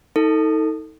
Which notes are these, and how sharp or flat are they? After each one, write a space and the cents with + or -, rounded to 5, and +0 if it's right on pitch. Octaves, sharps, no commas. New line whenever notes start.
D#4 +30 A4 +20